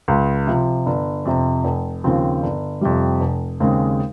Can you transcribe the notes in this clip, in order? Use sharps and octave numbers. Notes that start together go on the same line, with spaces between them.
C#2
C3 F3
G1
F2 C3
F1
D#2 C#3 F3 C4
G1
F2 C3 G3
F1
D#2 C#3 G#3 C4